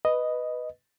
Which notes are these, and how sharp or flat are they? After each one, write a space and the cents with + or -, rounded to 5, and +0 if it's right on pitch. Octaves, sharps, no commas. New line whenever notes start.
B4 +0 D#5 +0